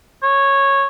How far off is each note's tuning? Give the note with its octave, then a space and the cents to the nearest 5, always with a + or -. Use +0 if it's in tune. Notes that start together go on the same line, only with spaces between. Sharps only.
C#5 -10